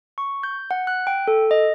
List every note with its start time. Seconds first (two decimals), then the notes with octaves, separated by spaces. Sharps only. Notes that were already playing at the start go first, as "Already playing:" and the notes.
0.18 C#6
0.43 G6
0.71 F#5
0.87 F#6
1.07 G5
1.28 A4
1.51 D#5